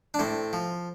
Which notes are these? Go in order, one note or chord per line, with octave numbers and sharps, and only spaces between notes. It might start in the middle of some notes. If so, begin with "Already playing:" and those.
D4
A2 C4
F3